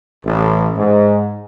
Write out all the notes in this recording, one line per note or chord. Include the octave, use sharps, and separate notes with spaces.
A1
G#2